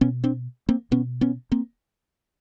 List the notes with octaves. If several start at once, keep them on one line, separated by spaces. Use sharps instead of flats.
B2 B3 C#4
C4 D4
A#3 C4
B2 B3 C#4
B3 C#4
A#3 C4